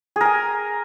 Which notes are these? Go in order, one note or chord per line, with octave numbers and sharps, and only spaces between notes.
G#4 A#4 G#5